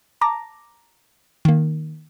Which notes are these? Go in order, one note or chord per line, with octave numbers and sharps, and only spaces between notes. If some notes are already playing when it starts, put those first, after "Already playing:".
A5 A#5 D6 A#6
D#3 A#3